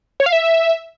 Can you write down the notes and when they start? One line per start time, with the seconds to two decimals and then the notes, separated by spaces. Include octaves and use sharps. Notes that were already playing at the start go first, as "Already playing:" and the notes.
0.20 C#5
0.26 F5
0.32 E5